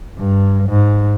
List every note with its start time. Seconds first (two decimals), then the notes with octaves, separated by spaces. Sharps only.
0.19 G2
0.69 G#2